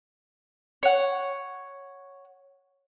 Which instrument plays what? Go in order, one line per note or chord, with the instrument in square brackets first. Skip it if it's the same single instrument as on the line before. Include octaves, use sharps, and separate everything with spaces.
[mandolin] C#5 F#5